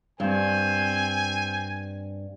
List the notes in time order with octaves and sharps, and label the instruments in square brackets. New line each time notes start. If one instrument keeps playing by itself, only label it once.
[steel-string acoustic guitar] G2 [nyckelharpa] C4 C5 [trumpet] G#5